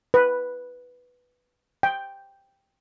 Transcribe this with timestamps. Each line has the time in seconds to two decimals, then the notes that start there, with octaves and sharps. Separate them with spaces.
0.14 B4
1.83 G5